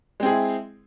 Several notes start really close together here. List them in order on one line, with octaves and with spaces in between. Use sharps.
G#3 C4 G#4 E4